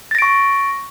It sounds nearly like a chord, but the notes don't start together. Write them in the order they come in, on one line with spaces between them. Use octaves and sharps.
A6 A#6 D7 C#6